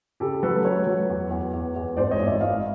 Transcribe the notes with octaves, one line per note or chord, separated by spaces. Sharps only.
C#3 G4 A4
F#3 A4 B4
F#3 B4 C#5
F#3
E2
E2
E2
E2
G#1 C5 D5
C#5 D#5
G#1
D5 E5
G#1 D#5 F5